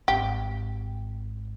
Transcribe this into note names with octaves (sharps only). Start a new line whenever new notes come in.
G#1 G#2 G4